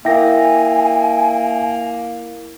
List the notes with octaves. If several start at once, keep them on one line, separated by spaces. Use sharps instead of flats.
A#3 E4 A#4 E5 G5 G#5 A#6